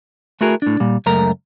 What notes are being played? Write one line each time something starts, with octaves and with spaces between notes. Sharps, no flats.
A3 E4 F#4 G#4 A#4
A2 D4
A#2 G3
C#2 F#2 A3 A#4 A#5